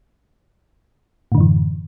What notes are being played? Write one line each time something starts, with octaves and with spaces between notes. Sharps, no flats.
F#2 A2 D3 E3